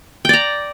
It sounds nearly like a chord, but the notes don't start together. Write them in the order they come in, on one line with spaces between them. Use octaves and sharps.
G5 D5 A#5